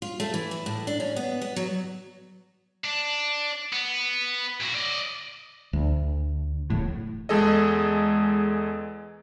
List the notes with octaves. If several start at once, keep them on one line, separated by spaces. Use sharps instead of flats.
F4
A3
E3
E4
A2
D4
C#4
B3
B3
F#3
D4
B3
A#2 F#4
D5 D#5
D2
D1 E2 A2
E2 G#3 G#4 A4 D#5